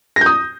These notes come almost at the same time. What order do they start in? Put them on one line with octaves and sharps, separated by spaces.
A#6 G6 D#6